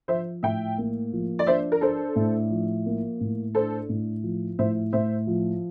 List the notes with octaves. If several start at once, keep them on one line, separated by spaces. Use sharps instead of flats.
F3 C5 E5
A2 E5 G5
A#3
F3
D5
D4 C5 E5
A#4
D4 A4 C5
A2
F3
A#3
A2
D4 A4 C5
A2
F3
A2 C5 E5
A2 C5 E5
F3